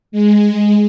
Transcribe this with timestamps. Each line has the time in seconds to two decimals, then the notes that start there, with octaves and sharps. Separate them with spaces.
0.12 G#3